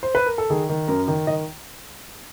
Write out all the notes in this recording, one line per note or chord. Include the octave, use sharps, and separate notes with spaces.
C5
B4
A#4
A4
D#3 G#4
D#3
F#2 A#4
D#3
D#3 D#5